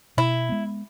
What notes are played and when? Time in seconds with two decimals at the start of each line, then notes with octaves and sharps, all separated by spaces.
0.17 B2 E4
0.49 G#3 B3